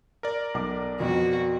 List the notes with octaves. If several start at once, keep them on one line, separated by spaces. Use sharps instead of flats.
A#4 D5
B1 D6
F2 B2 F#4